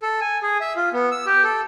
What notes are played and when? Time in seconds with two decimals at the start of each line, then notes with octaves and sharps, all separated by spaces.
0.02 A4
0.21 G#5
0.42 G#4
0.61 E5
0.76 F4
0.93 B3
1.11 E6
1.26 G4
1.44 A4